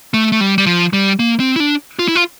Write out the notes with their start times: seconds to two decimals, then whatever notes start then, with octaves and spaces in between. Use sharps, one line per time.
0.14 A3
0.32 A3
0.41 G3
0.58 G3
0.66 F3
0.93 G3
1.19 A#3
1.40 C4
1.56 E4
1.60 D4
1.99 F4
2.08 E4
2.16 F4